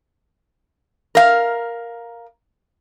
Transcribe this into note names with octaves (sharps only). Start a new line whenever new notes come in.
A#4 F5